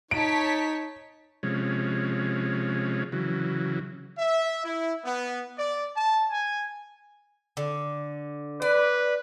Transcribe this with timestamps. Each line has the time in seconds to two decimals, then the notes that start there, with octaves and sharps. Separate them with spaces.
0.11 D#4 C#5 A5 B6 D7
1.43 C3 F3 G#3 C#4
3.12 C#3 E3 F#3
4.18 E5
4.63 E4
5.05 B3
5.57 D5
5.96 A5
6.29 G#5
7.57 D3
8.62 B4 D5